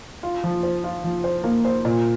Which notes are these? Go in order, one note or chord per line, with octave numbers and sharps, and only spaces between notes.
F4
F3
C5
F4
F3
C5
A#3
C5
A#2